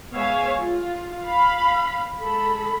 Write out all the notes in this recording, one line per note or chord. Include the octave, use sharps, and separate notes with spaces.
G#3 B3 C#5 E5 F5 G#5
F4
F5 B5
G#3 A4 B5